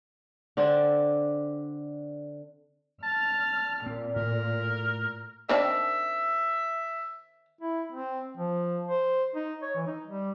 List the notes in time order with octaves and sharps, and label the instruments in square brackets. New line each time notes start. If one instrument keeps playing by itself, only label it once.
[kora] D3 C4 D4
[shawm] A5 [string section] F6
[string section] A#2 [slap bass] C4
[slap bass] A2 [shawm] A#4
[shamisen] D#3 C4 D4 [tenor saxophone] E5
[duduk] E4
C4
F3
C5
D#4
C#5
E3
D#4
G3